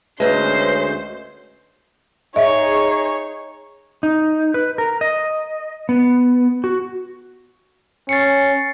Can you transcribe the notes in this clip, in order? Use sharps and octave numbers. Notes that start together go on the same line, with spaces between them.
D2 G#3 C#4 B4 C5
D#4 G#4 C#5 D#5 E5
D#4
B4
A#4
D#5
B3
F#4
C#4 A6 C7 C#7